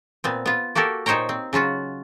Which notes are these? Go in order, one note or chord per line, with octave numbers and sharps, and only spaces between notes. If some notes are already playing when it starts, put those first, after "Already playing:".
A#2 B3 C4
B3 F4
A#3 F#4 G4 A4 A#4
A#2 D#4 C5 C#5 G5 A#5
C4
C#3 F#3 F4 F#4